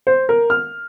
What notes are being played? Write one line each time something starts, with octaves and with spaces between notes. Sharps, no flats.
C5
A#4
F6